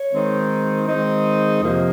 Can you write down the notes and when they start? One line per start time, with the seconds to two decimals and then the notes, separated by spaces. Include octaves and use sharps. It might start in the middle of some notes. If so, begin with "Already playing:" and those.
Already playing: C#5
0.11 D#3 G#3 C4 D#4
0.87 D#3 G#3 C4 D#4 D#5
1.61 F2 C3 F3 A#3